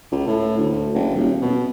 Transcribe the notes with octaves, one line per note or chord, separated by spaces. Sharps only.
C#2
A2
D2
F#1
D#1
B2